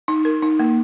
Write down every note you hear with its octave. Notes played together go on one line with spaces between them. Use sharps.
D#4
A#4
D#4
A#3